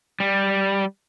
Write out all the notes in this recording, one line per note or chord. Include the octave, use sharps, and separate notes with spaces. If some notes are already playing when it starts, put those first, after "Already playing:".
G3